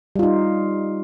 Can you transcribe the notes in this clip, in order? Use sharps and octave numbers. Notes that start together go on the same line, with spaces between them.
G3 D#4 F4